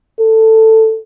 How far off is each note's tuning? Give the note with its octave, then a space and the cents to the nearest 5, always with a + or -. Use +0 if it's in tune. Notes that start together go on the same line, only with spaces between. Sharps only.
A4 +10